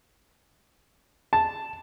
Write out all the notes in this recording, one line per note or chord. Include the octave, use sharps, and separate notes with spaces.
A5